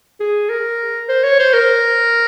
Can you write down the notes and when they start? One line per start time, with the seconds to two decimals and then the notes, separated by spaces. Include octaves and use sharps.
0.20 G#4
0.50 A#4
1.09 C5
1.24 C#5
1.39 C5
1.53 A#4